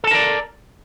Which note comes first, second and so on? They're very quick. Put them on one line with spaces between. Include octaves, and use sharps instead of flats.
A4 A5 A#4 D5